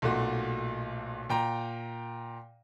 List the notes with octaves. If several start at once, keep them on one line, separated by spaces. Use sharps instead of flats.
B1 A#2 A3 F#4
A#2 G5 A#5